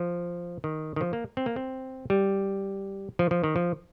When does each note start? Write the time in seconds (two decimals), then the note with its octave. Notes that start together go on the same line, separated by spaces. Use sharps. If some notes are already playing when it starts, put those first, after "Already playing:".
Already playing: F3
0.64 D#3
0.96 D#3
1.01 F3
1.13 A#3
1.37 C4
1.46 A#3
1.56 C4
2.10 G3
3.19 F3
3.31 F3
3.44 D#3
3.56 F3